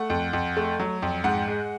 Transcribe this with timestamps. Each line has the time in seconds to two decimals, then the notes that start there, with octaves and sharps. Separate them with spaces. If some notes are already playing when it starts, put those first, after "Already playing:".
Already playing: A3 F#5
0.10 F2
0.33 F2
0.57 A3
0.80 F#3
1.02 F2
1.24 G#2 F#5
1.48 G#3